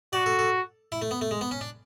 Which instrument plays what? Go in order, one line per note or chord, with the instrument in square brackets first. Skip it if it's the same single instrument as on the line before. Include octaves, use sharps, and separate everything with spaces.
[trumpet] F#4 [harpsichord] D5
[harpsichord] A4
A4
E4
A3
B3
A3
G#3
B3
C#4
D4